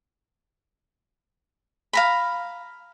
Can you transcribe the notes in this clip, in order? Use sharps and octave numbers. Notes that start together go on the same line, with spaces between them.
F5 A#5 B5